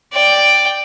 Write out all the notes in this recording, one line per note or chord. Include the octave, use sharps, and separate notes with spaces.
D5 G5